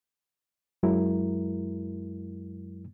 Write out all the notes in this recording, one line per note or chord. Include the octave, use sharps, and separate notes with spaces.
F#2 F#3 G#3 E4 A#4